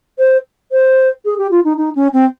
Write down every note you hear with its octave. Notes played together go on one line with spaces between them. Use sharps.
C5
C5
G#4
G4
F4
D#4
D#4
C#4
C4